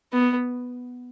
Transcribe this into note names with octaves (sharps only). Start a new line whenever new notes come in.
B3